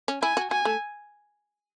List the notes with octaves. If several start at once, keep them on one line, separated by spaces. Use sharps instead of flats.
C#4
E4 G#5
F#4
F#4 G#5
A3